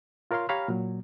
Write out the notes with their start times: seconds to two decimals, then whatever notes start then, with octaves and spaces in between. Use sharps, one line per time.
0.31 F4 A#4 C#5 F5 C6
0.49 G4 C#5 F5 A#5 B5 F6
0.68 A#2 F#3